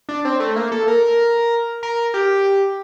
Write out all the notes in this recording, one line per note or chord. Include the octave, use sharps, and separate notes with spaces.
D4
C4
A3
A#3
A4
A#4
A#4
G4